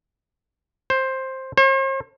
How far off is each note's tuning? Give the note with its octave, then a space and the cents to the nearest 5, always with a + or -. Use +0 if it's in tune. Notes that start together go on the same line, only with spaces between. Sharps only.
C5 +10
C5 +45